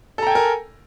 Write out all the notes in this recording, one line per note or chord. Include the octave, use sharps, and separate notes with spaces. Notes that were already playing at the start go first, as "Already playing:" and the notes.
A4 A#4 G5 G#5 A#5